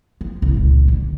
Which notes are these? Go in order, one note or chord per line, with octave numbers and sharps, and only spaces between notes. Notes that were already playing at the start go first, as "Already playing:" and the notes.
F3
C2
C#2 A#2
D3